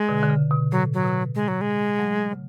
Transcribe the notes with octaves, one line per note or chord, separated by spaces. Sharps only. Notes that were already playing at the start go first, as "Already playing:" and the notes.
Already playing: G#3
B2 D3
D3
C#3
B2
A2 F#3
F#3
B2
G#3
F#3
G#3
F#3 A3
C#3